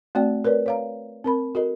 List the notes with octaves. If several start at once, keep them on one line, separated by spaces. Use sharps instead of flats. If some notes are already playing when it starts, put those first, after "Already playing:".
A3 C4 F#4 D5 G5
A#4 B4 C#5 D5
C#5 F5 A#5
C4 A#4 B5
F#4 A4 A#4 D#5